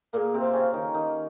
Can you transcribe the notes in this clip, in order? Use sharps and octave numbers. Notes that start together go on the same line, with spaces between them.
A#2 A#3 G#4 A#4
C3 C4
C5
C#3 C#4
D#3 D#4
D#3 D#4